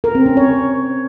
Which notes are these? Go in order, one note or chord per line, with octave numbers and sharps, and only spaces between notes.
A#4
C4
C#4
C#5